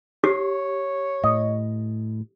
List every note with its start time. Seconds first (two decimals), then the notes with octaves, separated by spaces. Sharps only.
0.24 G4 C#5
1.24 A2 D#5